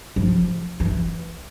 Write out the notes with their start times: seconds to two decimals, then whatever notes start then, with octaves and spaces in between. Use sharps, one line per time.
0.16 F3
0.80 E3